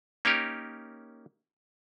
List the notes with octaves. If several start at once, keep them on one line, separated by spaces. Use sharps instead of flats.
A#3 C#4 D#4 G4 A#4